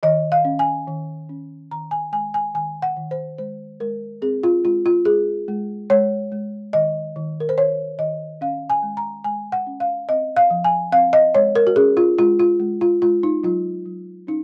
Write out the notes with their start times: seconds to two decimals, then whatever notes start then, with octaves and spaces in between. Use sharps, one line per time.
0.03 D#3 D#5
0.32 F5
0.45 C#4
0.59 G#5
0.88 D#3
1.29 C#4
1.71 D#3 A#5
1.91 G#5
2.12 G#3 G#5
2.34 G#5
2.54 D#3 G#5
2.82 F#5
2.96 D#3
3.11 C5
3.38 G#3 C5
3.80 G#3 A#4
4.22 C4 G#4
4.43 F4
4.64 G#3 F4
4.86 F4
5.05 G#3 G#4
5.48 G#3
5.90 G#3 C#5
6.32 G#3
6.73 D#3 D#5
7.16 D#3
7.40 A#4
7.49 C5
7.57 D#3 C#5
7.99 D#3 D#5
8.41 C#4 F5
8.70 G#5
8.83 G#3
8.97 A#5
9.24 G#3 G#5
9.52 F#5
9.67 C#4
9.80 F5
10.09 C4 D#5
10.36 F5
10.50 F3
10.64 G#5
10.92 C4 F5
11.13 D#5
11.35 G#3 C#5
11.55 A#4
11.67 F#4
11.76 C#4 G#4
11.97 F4
12.18 G#3 F4
12.39 F4
12.60 G#3
12.81 F4
13.02 G#3 F4
13.23 D#4
13.43 F#3 F4
13.86 F#3
14.27 C#4 D#4